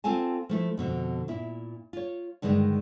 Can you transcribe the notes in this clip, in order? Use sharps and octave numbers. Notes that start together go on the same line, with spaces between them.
C4 F4 A4 F5 G#5 A5
F3 A3 E4
F2 B2 D3
A#2 E4
F4 C#5
G2 D3 D#3 G#3 D4 D#4